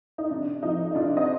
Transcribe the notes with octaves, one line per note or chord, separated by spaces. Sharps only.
D#4
C3 D4
F3 D#4
D#4
C3 D4 F4
C5 D#5